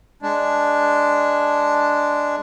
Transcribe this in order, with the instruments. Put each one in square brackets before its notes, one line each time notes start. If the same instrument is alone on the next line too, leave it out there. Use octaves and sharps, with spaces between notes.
[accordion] G#3 D4